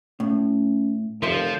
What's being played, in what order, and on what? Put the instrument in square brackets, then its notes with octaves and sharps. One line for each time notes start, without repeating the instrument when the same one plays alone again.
[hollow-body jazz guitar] A2 [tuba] C#4
[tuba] F1 [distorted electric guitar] F3 [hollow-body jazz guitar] A#4 E5 C6